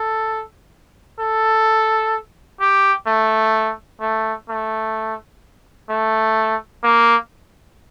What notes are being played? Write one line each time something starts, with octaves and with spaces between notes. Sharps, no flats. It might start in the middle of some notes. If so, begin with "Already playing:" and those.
Already playing: A4
A4
G4
A3
A3
A3
A3
A#3